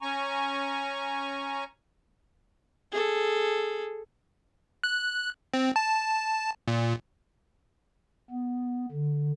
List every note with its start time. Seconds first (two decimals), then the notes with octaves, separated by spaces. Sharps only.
0.02 C#4 G#5 A#5 C#6
2.92 G#4 A4
4.84 F#6
5.54 C4
5.76 A5
6.68 A#2
8.30 B3
8.92 D3